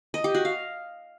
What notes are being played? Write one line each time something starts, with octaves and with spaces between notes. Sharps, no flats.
D#5
G4
F#4
F5